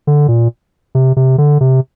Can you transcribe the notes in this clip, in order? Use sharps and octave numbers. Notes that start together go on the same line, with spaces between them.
D3
A#2
C3
C3
D3
C3